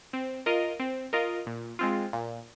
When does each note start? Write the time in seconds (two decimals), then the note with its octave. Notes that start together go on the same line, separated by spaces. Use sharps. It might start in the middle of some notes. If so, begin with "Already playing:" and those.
0.13 C4
0.46 F4 A#4 D#5
0.80 C4
1.13 F4 A#4 D#5
1.46 A#2
1.79 G#3 C4 F4
2.13 A#2